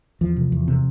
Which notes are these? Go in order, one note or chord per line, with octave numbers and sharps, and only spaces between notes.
E2 F3
C3
E2
C3